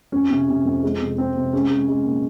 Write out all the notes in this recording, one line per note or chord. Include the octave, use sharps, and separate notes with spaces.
F2 C#4
C3
C3
F2
G#3
C3
G#3 C4
C3
G#3 C#4
G#3
G#3
A#2